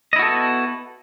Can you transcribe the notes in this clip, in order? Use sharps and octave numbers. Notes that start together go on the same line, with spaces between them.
B3 E4 F#4 A4 D#5